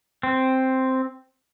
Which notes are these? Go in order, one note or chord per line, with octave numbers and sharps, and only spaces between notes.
C4